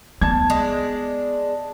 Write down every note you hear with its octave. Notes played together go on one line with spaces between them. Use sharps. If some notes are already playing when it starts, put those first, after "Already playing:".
B3 A5 G#6
G#3 D4